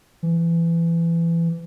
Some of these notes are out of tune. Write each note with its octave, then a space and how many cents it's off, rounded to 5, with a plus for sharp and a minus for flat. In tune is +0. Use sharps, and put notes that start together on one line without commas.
E3 +25